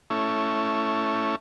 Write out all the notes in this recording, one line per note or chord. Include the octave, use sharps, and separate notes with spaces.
A3 C#4 E4